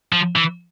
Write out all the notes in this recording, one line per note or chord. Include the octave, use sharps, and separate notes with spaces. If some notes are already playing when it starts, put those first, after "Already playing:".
F3
E3